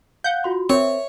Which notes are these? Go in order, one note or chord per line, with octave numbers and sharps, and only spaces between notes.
F5 F#5 G6
F4 F#4 C6
C4 A#4 C#5 E5